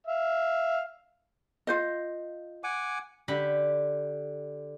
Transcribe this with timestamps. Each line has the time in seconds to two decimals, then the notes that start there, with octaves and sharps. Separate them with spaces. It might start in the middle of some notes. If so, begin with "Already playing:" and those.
0.07 E5 F5
1.67 F4 C5 D#5
2.64 F#5 G#5 D6
3.28 D3 G4 B5